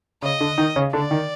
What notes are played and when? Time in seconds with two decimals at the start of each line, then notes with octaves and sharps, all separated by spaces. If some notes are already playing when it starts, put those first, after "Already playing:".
0.22 C#3 C#4 D#5
0.41 D3 D4
0.58 D#3 D#4
0.76 C#3 C#4
0.93 D3 D4 D5
1.11 D#3 D#4